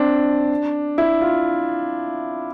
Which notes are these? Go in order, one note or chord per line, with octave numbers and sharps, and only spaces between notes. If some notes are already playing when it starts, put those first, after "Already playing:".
Already playing: C4 D4
E4
F4